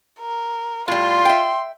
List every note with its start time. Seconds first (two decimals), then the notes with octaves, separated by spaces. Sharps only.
0.20 A#4
0.88 A2 G3 F4 C6
1.25 E5 G5